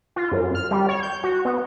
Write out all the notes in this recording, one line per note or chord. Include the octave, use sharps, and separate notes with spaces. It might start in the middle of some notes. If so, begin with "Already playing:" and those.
F4
F#2
F6
G3
C#5
G6
F#4
B3